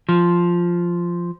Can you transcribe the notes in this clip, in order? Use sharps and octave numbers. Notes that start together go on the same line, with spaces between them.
F3